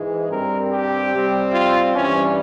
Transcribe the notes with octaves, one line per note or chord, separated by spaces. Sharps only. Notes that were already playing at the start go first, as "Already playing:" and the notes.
Already playing: G#2 E3 G#3
G2 G3 C4 A#4
G4
C3 G3 C4
F4
G2 E3 G3 C#4